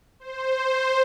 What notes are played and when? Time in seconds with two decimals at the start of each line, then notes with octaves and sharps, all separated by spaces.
0.20 C5